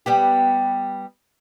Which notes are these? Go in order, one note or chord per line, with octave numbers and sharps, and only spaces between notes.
G3 B3 G4